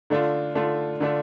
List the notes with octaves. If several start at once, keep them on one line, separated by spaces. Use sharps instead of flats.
D3 A3 D4 F4
D3 A3 D4 F4
D3 A3 D4 F4